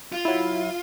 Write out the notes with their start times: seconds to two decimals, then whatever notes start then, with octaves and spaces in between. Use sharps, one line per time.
0.12 F4
0.25 F#3 E4